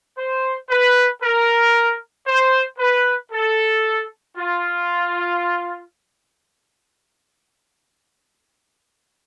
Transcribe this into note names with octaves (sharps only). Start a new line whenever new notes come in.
C5
B4
A#4
C5
B4
A4
F4